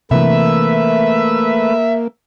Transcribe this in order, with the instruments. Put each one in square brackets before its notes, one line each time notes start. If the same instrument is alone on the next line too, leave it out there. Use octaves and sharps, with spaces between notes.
[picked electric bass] C3 E3 [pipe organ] A3 B4 [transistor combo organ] A#3 [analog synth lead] E5